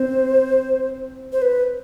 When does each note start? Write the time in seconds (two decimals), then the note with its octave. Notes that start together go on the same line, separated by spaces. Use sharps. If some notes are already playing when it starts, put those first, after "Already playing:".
Already playing: C4 C5
1.33 C5
1.42 B4